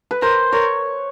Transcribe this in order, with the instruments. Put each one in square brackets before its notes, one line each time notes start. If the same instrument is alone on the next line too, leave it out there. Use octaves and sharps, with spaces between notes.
[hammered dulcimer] B4
[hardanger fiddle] A#4 [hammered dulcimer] C5
[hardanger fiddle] A#4 [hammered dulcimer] C#5